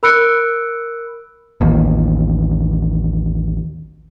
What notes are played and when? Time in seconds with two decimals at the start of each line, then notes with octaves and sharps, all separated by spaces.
0.03 A#4 B5 E6 F#6 C#7 D7
1.61 A1 D#2